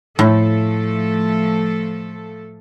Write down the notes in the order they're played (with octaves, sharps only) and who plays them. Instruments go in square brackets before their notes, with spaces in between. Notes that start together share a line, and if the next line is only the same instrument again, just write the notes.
[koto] A2 [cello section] F3 A3 A4